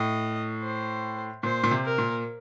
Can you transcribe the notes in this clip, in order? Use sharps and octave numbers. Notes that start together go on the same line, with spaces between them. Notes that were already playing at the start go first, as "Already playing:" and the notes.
Already playing: A2 D#5
C5
A#2 C5
A#2
C3
A#4
A#2